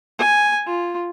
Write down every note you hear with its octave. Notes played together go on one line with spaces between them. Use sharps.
G#5
F4